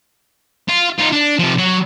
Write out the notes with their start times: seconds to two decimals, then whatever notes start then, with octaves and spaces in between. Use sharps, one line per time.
0.69 F4
0.98 D#4 F4
1.12 D4
1.39 C3 F3
1.58 F#3